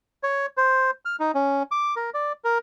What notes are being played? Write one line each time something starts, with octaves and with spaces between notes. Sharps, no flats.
C#5
C5
F6
D#4
C#4
D6
A#4
D5
A#4